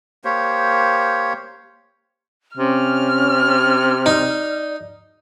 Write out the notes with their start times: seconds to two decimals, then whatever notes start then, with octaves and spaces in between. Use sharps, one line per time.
0.24 A#3 G4 C5 C#5
2.57 C3 C#4 F6
4.06 D#4 D5